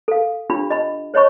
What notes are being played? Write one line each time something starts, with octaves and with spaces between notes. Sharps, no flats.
A4 F5
D4 F4 G4 B5
D#5 B5
C5 C#5 D#5 B5 C#6